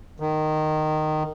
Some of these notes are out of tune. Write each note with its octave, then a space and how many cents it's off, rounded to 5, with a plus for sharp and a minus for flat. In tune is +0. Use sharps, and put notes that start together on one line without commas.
D#3 -10